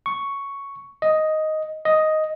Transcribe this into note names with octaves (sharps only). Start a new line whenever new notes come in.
C#6
D#5
D#5